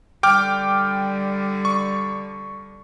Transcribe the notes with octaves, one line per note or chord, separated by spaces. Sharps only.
D3 G3 G5 D6 F6
C#6